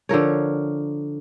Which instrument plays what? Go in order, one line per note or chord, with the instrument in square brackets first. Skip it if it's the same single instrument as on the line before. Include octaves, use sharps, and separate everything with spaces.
[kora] D3 F3 A#4 C#5